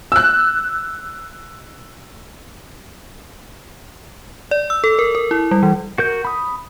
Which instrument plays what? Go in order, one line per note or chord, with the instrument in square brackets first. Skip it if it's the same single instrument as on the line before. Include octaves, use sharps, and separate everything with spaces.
[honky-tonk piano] E6 F#6
[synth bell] D5
E6
A4
A#4
A#4
E4
G3
E3
[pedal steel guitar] F#4 A#4 G6
B5 D#6